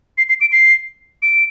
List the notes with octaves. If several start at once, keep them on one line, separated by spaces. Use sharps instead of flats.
C7
C7
D7
C7
D7